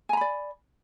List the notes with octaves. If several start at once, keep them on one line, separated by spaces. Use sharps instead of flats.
D5 G#5 A#5 B5